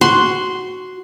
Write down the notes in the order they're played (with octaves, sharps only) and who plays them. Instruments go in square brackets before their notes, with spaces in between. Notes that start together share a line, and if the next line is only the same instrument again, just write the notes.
[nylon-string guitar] F#4 [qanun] C6